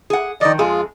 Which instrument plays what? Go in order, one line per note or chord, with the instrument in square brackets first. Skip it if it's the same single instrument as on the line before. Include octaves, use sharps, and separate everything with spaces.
[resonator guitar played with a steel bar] G#4 F#5
[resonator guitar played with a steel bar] D#3 F3 [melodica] D5 D#5
[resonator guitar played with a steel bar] F2 G#3 G#4 [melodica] F4